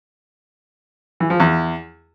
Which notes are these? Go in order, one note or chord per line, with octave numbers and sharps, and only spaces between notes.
E3
F3
E2